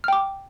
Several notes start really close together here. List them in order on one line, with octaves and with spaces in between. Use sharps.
F6 G5 D6